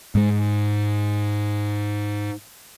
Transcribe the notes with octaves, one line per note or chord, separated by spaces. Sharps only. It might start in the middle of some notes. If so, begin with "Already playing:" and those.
G#2 G#3